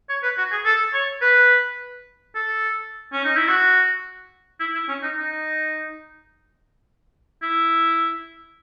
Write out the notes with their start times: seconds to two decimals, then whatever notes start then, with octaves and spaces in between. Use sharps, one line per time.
0.09 C#5
0.23 B4
0.38 F#4
0.52 G#4
0.65 A4
0.93 C#5
1.22 B4
2.35 A4
3.13 C#4
3.24 D#4
3.36 E4
3.48 F#4
4.60 E4
4.75 E4
4.89 C#4
5.03 D#4
5.17 D#4
7.42 E4